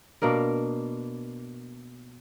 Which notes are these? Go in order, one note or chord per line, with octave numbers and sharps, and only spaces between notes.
B2 A#3 D4 A#4